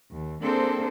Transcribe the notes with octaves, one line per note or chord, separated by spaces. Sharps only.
D#2
A#3 C4 D4 G#4 A4 C5